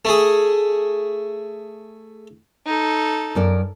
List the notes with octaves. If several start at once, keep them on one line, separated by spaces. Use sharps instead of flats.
A3 G#4
D#4 A4
F#2 A#4 D5